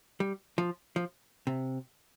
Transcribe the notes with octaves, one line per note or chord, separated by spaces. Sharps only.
G3
F3
F3
C3